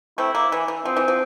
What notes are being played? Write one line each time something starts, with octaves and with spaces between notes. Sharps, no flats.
A3 C4 E4
A#3
E3
E3
F3 C4
E3
F3